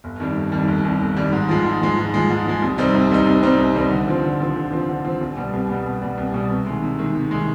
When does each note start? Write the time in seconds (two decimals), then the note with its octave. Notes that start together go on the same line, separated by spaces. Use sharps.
0.04 G1
0.20 F2 D#3 G3
0.36 G1
0.52 F2 D#3 G3
0.68 G1
0.85 F2 D#3 G3
1.01 G1
1.16 F2 D#3 G3
1.33 G#2
1.49 F3 G#3
1.65 G#2
1.81 F3 G#3
1.97 G#2
2.14 F3 G#3
2.30 G#2
2.45 F3 G#3
2.62 C2
2.78 C3 G3 C4 D#4
2.94 C2
3.11 C3 G3 C4 D#4
3.27 C2
3.43 C3 G3 C4 D#4
3.59 C2
3.75 C3 G3 C4 D#4
3.91 D3
4.08 F3 C4
4.24 D3
4.40 F3 C4
4.56 D3
4.72 F3 C4
4.89 D3
5.05 F3 C4
5.21 C2
5.37 B2 G3
5.53 C2
5.69 B2 G3
5.86 C2
6.02 B2 G3
6.18 C2
6.34 B2 G3
6.50 C3
6.66 D#3 G#3
6.82 C3
6.99 D#3 G#3
7.15 C3
7.31 D#3 G#3